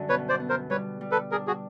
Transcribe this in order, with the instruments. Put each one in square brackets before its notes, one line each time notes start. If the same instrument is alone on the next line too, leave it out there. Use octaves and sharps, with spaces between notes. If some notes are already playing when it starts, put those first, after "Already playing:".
Already playing: [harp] F#2 D3 G3
[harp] B2 [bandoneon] B4 C#5
[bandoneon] C5 D5
[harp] B3
[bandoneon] A#4 C5
[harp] G3 [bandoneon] B4 C#5
[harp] G3
[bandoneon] A4 B4
[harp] D4 [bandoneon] G#4 A#4
[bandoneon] F#4 G#4